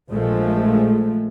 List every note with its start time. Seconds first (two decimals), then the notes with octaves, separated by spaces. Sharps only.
0.10 A#1 F3 G#3 A3